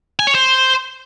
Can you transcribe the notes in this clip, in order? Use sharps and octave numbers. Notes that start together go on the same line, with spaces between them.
G#5
C#5
C5